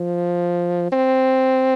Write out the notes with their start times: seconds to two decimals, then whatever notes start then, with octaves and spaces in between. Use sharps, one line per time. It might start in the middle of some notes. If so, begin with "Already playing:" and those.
Already playing: F3
0.92 C4